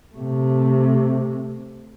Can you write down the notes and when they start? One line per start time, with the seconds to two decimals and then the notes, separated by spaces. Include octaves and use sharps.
0.15 C3 A3